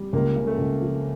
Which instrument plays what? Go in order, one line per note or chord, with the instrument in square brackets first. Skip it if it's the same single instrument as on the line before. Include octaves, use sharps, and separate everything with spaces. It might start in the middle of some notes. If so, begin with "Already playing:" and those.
Already playing: [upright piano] G3
[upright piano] C#2 [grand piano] A#3
[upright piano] C#3
[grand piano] A3
[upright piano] C#2
F3